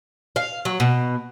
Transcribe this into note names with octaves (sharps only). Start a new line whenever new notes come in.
F5
F#3
B2